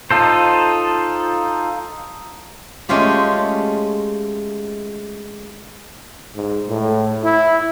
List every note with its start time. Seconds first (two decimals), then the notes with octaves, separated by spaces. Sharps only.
0.11 D#4 F4 A4 C5
2.89 G#3 A3 C#4 F4 G4
6.35 G#2
6.68 A2
7.23 E4